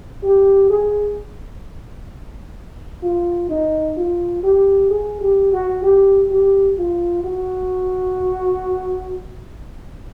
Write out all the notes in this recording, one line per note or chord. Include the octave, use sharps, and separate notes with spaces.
G4
G#4
F4
D#4
F4
G4
G#4
G4
F#4
G4
G4
F4
F#4